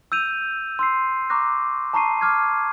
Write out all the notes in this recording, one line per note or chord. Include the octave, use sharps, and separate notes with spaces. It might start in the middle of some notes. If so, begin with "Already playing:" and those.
E6 G6 D#7 F7
C6 E6 C7
A#5 C#6 D6 F#6 A#6
A5 A#5 C#6 C7 D#7
D6 F6 F#6 G#6